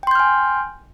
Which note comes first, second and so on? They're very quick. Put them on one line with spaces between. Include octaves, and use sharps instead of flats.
G5 C6 G6 F6 G#5